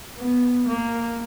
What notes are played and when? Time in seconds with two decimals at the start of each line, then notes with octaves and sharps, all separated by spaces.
0.18 B3
0.68 A#3